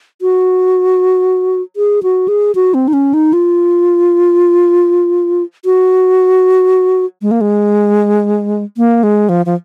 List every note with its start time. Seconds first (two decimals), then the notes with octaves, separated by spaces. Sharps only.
0.22 F#4
1.76 G#4
2.03 F#4
2.28 G#4
2.55 F#4
2.74 C4
2.88 D#4
2.93 C#4
3.14 D#4
3.33 F4
5.65 F#4
7.22 G#3
7.31 A#3
7.41 G#3
8.77 A#3
9.03 G#3
9.29 F3
9.46 F3